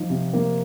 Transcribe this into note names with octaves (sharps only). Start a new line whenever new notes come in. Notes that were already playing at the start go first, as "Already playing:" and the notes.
Already playing: F3 D#4
C3
A#3